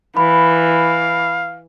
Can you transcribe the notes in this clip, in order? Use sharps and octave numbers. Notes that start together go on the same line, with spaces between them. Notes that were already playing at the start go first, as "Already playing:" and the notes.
E3 F5 B5